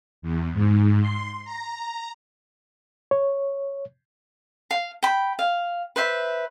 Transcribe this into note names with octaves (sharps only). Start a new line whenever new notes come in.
E2
G#2
C6
A#5
C#5
F5
G5 B5
F5
B4 C5 E5